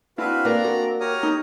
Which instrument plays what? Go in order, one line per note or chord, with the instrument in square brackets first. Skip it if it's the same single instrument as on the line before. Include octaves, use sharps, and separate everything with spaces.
[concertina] C4 D4 [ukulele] E4 [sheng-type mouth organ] F#4 B4 F5
[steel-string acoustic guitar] A#3 [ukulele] B4 [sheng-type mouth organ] D5 A#5
[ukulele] F#4
[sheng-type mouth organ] G4 D#6 F6 [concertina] C#5 A#5
[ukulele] D#4